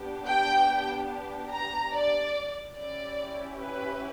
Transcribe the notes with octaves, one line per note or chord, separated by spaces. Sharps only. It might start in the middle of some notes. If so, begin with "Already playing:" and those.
Already playing: B3 D4 G4
G5
A#5
D5
C#4 E4 G4 D5
B4